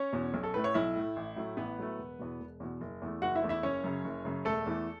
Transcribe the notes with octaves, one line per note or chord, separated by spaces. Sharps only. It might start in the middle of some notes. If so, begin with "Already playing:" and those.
Already playing: C#4 C#5
E2 B2
B1
A4
A2 A3 B4
C#5
B1 E4 E5
A2 A3
A1
A2 F#3 A3
A1 B3 B4
A2 F#3 A3
E1
E2 B2
E1
E2 B2
F#1
E2 E3 A3
F#1 F#4 F#5
E4 E5
E2 E3 A3
E4 E5
F#1 C#4 C#5
F#2 C#3
F#1
F#2 C#3
E1 A3 A4
E2 E3 A3